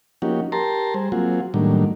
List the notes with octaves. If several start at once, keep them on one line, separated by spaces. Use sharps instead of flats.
F3 A#3 C#4 D#4 F#4 G4
G4 A#4 A5 A#5 C6
G3 G#4 C5
F#3 A#3 C4 F4 F#4 G#4
A2 D#3 F#3 G3 A#3 D4